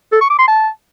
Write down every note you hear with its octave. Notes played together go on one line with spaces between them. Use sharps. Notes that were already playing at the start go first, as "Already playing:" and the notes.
A4
C#6
D6
C6
A5